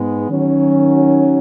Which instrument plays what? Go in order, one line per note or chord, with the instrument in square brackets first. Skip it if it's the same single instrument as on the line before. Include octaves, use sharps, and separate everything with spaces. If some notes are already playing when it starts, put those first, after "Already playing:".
Already playing: [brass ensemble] G#2 G#3 B3
D#3 F#3 C#4